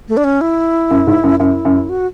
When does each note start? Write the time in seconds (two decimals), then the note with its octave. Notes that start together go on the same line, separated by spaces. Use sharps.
0.09 A3
0.17 D4
0.24 C#4
0.41 E4
0.91 F#2
1.07 G#2
1.23 F#2
1.40 F#2 E4
1.65 F#2
1.89 F#4